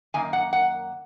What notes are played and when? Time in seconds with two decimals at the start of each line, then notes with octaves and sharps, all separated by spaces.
0.14 F#2 D#3 A#3 G#5
0.33 F#5
0.53 F#5